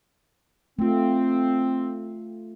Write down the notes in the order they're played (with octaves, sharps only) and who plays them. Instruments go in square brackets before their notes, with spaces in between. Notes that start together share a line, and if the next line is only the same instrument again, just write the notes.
[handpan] A3 F4 [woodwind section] C4